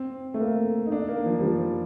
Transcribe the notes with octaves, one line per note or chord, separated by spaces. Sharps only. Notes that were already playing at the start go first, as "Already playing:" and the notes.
Already playing: C4
A3
A#3
D#4
D4
A#3
F3
G3
F3